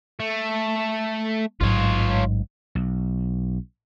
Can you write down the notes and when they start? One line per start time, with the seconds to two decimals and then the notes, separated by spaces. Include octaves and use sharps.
0.20 A3
1.61 A1 G#2 F#3 F4 C#5
2.75 B1